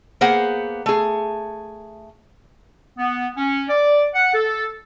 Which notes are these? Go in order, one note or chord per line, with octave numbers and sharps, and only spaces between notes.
A#3 B3 G#4 C5 F#5
A3 G#4
B3
C#4
D5
F#5
A4